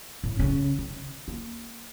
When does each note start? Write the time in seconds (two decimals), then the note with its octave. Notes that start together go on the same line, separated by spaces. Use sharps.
0.24 A2
0.39 C#3 C#4
0.79 D#3
1.28 A#3